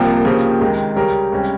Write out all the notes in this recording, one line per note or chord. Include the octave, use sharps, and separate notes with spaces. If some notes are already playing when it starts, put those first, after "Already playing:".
Already playing: C2 C3 F3 A#3
C#3 F3 C4 G4
C#2 C3 D#3 G#3
C#3 G3 C#4 G4 A#4
C#2 C3 G3 C#4